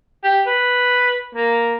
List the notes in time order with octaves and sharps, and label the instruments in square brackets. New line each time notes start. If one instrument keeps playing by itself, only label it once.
[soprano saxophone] G4
B4
A#3